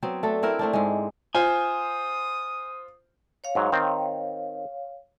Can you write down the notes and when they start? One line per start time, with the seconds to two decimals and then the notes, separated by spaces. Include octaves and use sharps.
0.03 F#3 B3 C4
0.23 A3 D4 A4
0.43 C4 E4 A#4 E5
0.59 A3 C4 D4
0.73 G#2 G#3
1.35 F4 C5 G#5 D#6
3.44 C#5 F5
3.55 G#2 F#3
3.72 D#3 C4